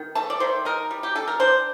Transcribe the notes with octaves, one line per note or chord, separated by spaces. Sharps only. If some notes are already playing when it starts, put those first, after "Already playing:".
Already playing: D#3
A3 A5
D5
D#3 C5
D#4 A#4
G3
G4
D4 A4
A#4
D4 C5